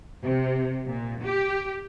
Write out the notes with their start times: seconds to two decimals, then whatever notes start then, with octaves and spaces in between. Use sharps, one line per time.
0.23 C3
0.86 A#2
1.24 G4